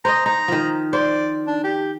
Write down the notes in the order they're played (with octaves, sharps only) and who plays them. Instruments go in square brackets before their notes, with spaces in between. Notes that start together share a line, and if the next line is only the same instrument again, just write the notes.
[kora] C5 D#5 [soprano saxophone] A#5
[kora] D#4 [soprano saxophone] A#5
[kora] D#3 F3
[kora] C5 [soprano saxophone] D5
[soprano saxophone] D4
G4